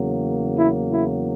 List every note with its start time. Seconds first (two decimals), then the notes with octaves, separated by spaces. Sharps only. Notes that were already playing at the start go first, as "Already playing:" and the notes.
Already playing: E2 C#3 F#3 A#3
0.56 E4
0.93 E4